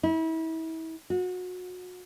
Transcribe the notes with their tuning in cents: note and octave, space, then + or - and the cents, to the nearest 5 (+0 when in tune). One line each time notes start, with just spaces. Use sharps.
E4 -35
F#4 -30